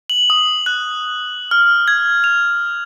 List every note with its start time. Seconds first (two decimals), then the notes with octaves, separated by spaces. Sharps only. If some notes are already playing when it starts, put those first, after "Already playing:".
0.10 F#7
0.30 D#6
0.66 F#6
1.51 F6
1.88 G#6
2.24 F7